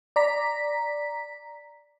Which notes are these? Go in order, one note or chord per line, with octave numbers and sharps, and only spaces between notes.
D5 A#5 B6